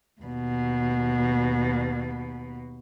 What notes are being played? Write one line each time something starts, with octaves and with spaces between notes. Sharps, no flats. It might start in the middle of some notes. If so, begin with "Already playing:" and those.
D#2 B2